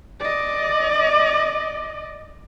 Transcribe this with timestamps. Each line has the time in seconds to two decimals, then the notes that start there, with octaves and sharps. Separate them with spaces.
0.20 D5 D#5